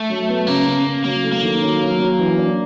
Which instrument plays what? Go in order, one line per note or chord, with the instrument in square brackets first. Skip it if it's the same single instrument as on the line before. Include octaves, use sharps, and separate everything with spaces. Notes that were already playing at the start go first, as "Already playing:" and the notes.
Already playing: [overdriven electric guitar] A3
[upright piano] F#3
B3
[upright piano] C#3 [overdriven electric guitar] A#3
[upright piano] C#3
C#3
[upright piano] F#3 [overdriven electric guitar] A#3
[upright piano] A3
[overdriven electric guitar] A#3
[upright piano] D#3
F#3
F#3
F#3
E3
D4